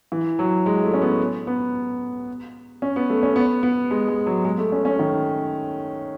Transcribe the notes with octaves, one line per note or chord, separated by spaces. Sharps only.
E3
F#3
G#3
A3
C#4
B3
B3
C#4
B3
A3
C#4
B3
B3
G#3
G#3
F#3
G#3
A3
C#4
C#4
D#3